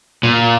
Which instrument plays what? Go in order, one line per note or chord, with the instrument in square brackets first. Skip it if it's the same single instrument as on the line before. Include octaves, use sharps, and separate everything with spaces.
[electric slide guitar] A#2